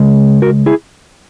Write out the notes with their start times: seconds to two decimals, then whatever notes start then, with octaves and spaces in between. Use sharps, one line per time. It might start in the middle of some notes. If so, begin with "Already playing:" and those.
Already playing: C#3 G#3
0.42 F#4 A#4
0.66 E4 G#4